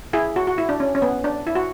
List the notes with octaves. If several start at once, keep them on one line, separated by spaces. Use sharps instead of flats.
E4 G#4
F#4
F#4
E4
D4
C#4
C#4
B3
D4
E4
F#4